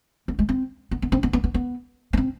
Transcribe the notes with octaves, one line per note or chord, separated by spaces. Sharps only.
B3
G#3
C4
B3
B3
C4
B3
B3
B3
B3
B3
C4